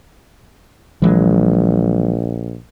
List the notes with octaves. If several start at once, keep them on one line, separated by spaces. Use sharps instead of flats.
A#1 E3 F#3 G#3